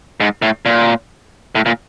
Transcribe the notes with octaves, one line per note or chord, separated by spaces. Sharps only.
G#2
A2
A#2
A2
A#2